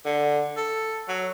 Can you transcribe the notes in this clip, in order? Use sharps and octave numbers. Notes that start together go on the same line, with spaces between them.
D3
A4
F#3